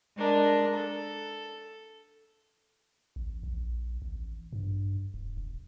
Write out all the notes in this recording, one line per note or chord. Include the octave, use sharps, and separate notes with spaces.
G#3 D4 A#4
A4
A1
A#1
A1
G2
D#1
E1